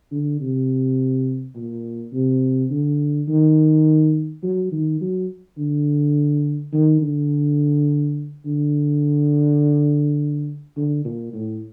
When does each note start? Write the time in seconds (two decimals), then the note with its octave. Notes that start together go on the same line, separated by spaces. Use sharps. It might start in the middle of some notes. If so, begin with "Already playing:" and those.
0.12 D3
0.40 C3
1.55 A#2
2.12 C3
2.71 D3
3.28 D#3
4.43 F#3
4.72 D#3
5.01 F#3
5.58 D3
6.73 D#3
7.02 D3
8.46 D3
10.76 D3
11.05 A#2
11.33 A2